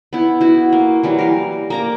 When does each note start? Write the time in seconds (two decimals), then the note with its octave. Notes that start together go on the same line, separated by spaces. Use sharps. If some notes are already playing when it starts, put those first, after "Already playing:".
0.13 B3 E4
0.41 E4 F#4
0.73 A#3
1.03 E3 F#3 G3
1.19 A#4 F5
1.70 A#3 A#5 D6